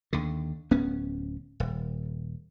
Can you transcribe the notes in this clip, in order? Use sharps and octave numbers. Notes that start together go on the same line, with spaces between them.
D#2 D3
D1 B3 C#4
D#1